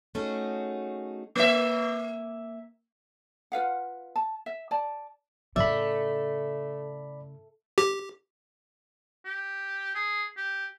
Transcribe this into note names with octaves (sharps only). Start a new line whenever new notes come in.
A3 C#4 D#4 F#4 G#4
A#3 E5
F4 B4 F5 F#5
A5
E5
D5 A5
A2 C#3 A3 D5 E5 B5
G4
G4
G#4
G4